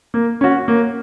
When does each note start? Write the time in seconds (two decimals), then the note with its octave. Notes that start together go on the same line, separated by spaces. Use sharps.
0.14 A#3
0.41 C#4 F#4
0.68 A#3